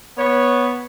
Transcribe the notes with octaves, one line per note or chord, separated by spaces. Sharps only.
B3 C#5